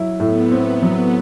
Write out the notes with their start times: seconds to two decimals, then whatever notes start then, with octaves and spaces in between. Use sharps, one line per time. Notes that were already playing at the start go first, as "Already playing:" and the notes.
Already playing: F#3 E4
0.20 A2 B3
0.51 C4
0.82 F#3